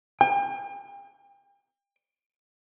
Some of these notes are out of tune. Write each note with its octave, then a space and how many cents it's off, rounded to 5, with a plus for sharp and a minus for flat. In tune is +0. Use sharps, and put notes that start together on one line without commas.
G5 +35